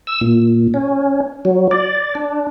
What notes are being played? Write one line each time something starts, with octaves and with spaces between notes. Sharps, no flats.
E6
A#2
C#4
F#3
D5
D4